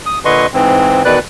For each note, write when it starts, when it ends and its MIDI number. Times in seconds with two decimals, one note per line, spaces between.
0.06 0.19 87
0.25 0.46 46
0.25 0.46 50
0.25 0.46 71
0.25 0.46 75
0.25 0.46 84
0.25 0.46 85
0.54 1.03 44
0.54 1.03 52
0.54 1.03 60
1.05 1.19 40
1.05 1.19 47
1.05 1.19 51
1.05 1.19 71
1.05 1.19 74
1.05 1.19 90